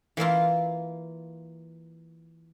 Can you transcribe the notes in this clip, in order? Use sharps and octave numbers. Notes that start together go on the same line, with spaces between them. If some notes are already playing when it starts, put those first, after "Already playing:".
E3 A#3 E4 F4